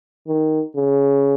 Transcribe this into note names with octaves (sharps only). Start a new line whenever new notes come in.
D#3
C#3